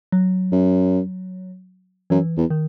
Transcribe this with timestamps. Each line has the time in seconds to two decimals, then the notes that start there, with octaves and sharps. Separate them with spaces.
0.12 F#3
0.52 F#2
2.10 F#2 E3
2.37 E2
2.50 D#3